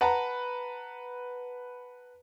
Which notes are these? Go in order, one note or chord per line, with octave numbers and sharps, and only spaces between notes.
B4 F#5 A5 A#5